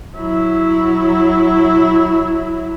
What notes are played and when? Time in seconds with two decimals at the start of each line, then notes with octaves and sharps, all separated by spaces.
0.16 F#3 E4